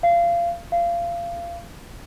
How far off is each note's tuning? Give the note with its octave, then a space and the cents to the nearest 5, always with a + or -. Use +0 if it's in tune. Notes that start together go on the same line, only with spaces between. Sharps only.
F5 -25
F5 -25